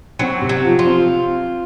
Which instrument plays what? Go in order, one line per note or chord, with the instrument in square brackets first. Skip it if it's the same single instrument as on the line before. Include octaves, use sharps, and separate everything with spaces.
[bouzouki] F#3 [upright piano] C4
[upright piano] C3
[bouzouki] F#3
[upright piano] F3
[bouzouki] F4
[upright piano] C4